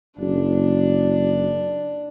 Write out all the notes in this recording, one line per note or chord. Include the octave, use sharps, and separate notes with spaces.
F#1 D4